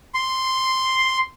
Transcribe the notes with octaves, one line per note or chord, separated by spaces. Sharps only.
C6